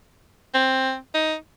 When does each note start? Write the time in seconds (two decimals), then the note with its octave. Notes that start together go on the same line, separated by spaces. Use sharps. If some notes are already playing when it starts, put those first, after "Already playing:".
0.54 C4
1.14 D#4